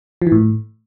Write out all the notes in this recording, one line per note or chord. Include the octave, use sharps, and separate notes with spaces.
F3
E3
A2